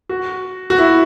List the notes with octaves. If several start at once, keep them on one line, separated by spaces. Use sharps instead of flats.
F#4
F#4
E4